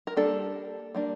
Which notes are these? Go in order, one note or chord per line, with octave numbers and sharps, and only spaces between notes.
A#4
G3 A#3 D4 A4
G3 A#3 D4